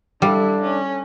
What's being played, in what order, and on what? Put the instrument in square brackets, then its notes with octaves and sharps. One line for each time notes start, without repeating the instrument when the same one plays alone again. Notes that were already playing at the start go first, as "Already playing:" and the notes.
[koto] G3 [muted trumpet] D4 [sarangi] E4 [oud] A4 F5
[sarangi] C#4